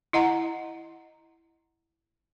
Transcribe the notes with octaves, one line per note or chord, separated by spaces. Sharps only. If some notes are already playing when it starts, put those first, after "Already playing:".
E4 D#5 F#5 A#5